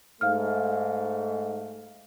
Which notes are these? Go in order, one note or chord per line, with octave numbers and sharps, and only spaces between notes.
G#2 A3 F5 F6